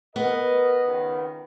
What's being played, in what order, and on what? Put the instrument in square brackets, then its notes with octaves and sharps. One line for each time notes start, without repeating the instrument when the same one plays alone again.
[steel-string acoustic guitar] B3 [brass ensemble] A#4 D#5
[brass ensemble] C#2 D#3